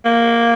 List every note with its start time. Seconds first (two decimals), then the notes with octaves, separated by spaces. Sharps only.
0.05 A#3